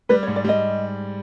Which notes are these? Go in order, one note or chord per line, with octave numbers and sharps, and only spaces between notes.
G3 B4
C#5
G#2
D5
G3 D#5